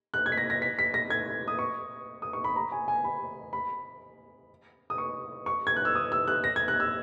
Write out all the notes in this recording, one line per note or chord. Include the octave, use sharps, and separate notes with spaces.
F#6
G#6
B6
A#6
A#6
B6
B6
A#6
G#6
D#6
C#6
D#6
C#6
B5
A#5
G#5
G#5
B5
B5
D#6
C#6
C#6
G#6
F#6
E6
D#6
E6
F#6
A#6
G#6
F#6
E6